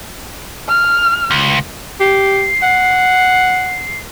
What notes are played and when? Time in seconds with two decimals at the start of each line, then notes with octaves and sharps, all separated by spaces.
0.69 F6
1.31 C#2
2.00 G4 C7
2.62 F#5